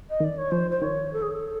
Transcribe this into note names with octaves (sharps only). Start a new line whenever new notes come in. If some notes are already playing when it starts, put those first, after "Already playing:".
D#5
D#3 D5
C#5
F3 C5
C5
D#3 C#5
A4
G#4
A4